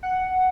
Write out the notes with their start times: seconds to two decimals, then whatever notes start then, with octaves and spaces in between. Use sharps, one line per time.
0.03 F#5